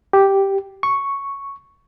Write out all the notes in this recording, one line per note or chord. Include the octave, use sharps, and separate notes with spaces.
G4
C#6